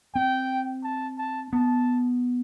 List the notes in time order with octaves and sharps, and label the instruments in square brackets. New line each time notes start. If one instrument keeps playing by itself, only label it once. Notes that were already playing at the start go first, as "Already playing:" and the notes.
[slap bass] C4 [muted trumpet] G5
[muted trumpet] A5
A5
[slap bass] B3 [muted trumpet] A5